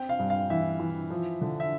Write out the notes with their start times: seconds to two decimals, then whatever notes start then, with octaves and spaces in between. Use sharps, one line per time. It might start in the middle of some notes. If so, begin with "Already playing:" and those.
Already playing: C4 G5
0.09 F5
0.19 G2
0.30 F5
0.50 E3 E5
0.80 E3
1.10 F3
1.41 D3
1.60 E5